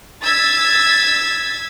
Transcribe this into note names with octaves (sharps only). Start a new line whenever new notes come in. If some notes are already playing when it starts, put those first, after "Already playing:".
E6 G#6 A6 B6